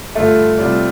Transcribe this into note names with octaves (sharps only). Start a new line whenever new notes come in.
G2 D3 G3 A3 F4
C3 G3 F4 D5